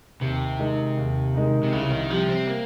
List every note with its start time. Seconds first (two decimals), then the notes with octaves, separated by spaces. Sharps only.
0.21 D#2 C3
0.59 D#3 G#3 D#4
0.97 D#2
1.34 D#3 G#3 D#4
1.63 C3
1.72 C2 C#3
1.91 D#3
2.09 C3 F3 G3
2.29 C4
2.47 A#3